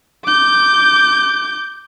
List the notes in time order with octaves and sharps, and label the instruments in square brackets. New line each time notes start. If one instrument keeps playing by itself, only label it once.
[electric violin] D6 G6